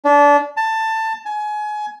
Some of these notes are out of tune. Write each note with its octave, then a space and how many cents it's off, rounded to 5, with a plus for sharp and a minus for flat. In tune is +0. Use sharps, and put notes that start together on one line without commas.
D4 -25
A5 +15
G#5 +25